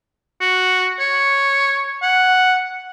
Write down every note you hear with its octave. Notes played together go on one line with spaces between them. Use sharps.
F#4
C#5
F#5